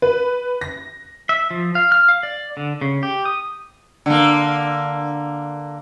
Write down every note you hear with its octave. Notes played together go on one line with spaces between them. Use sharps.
B4
A#6
E5
F3
F5
F6
F5
D5
D3
C#3
G4
D#6
D3 A#3